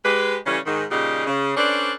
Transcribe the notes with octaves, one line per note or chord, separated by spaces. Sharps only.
G#3 G4 B4
C#3 E3 G3 A3 C#4
G#2 D#3
A#2 C#3 G3 D#4 G4 G#4
C#3
C#4 D4 A4 B4 C5 D5